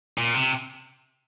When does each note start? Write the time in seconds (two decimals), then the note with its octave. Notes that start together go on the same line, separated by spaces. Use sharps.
0.18 A#2
0.34 C3